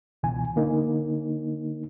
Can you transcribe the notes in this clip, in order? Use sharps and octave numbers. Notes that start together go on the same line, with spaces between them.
C#2 B2 E3 G#5
D3 A#3 D#4